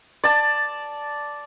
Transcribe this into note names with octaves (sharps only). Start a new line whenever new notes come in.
D5 A5